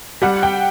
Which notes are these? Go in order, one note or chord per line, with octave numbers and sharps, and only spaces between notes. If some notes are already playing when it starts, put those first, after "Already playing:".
G3 F#5
G5